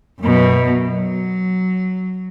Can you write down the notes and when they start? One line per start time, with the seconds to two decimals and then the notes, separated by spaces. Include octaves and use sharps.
0.20 F#2 B2
0.90 F#3